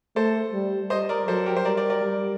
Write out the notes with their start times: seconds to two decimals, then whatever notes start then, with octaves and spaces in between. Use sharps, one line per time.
0.16 A3 A4 C5
0.53 G3
0.90 G3 C5 D#5
1.09 A#4 D5
1.28 F#3 A4 C5
1.46 G4 A#4
1.56 C5
1.65 G3 A#4 D5
1.77 A#4 D5
1.90 A#4 D5
2.03 G3